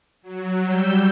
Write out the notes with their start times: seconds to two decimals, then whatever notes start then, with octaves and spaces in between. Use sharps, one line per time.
0.22 F#3
0.63 G3 E6 G6